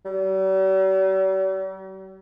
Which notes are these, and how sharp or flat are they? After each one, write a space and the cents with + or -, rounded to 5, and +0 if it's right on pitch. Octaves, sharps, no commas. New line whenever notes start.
G3 -45